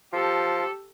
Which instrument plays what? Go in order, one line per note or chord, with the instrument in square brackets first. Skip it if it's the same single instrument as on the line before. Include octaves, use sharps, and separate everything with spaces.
[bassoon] F3 [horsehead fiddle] G4 A4